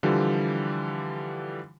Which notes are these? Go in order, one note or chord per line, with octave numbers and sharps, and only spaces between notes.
D3 E3 F3 G3 F4 G4